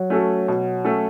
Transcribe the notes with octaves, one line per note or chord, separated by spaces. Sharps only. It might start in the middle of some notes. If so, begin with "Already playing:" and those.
Already playing: F#3
A3 C#4 F#4 A4
B2
A3 C#4 F#4 A4